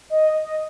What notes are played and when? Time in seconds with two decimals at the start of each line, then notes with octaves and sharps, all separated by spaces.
0.10 D#5
0.37 D#5